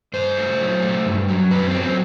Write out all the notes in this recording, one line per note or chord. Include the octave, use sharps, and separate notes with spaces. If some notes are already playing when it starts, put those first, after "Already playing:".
G2 C5
A3
F#3
A3
G2
F#3
F#2 B4
C4
F#3
C4